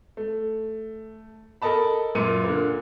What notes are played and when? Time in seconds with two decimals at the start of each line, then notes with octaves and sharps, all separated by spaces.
0.17 A3
1.62 A4 A#4 D#5 A5 B5
2.15 F#2 A#2 C#7 D#7
2.44 A#2 D3